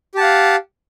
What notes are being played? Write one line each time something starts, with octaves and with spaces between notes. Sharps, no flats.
G4 F5 F#5 A5